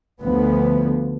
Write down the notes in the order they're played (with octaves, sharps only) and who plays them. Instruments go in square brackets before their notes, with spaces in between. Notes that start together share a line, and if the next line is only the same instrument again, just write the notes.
[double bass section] D2 D3 F3 B3